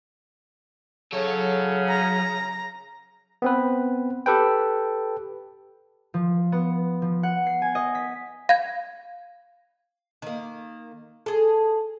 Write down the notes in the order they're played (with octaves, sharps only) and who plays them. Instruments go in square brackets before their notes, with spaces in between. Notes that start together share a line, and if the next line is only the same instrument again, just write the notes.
[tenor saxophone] C#3 [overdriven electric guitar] F#3 C#5 [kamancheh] A4
[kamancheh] A#5
[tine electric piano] B3 C4 B4
G4 A4 B4 G5
[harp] F3
B3
F3
F#5
C7
G#5
D#5
B6
[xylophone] F5 G#6
[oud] D#3 A#3
G#4 A4